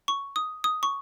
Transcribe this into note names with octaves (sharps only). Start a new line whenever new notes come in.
C#6
D#6
D#6
C#6